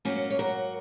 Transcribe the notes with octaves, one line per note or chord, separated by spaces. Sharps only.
G#2 F#3 A#3 C#4 F#4
C#5
F#4 A#4